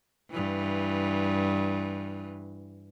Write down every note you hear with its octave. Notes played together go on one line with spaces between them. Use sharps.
G2 E3